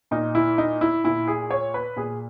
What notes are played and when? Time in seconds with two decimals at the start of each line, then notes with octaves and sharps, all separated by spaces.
0.11 A#2 D#4
0.35 E4
0.58 D#4
0.81 E4
1.04 A#2 E4
1.28 G#4
1.51 C#5
1.74 B4
1.96 A#2 G#4